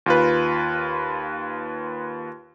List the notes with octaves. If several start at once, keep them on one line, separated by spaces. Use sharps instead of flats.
D#2 F4 B4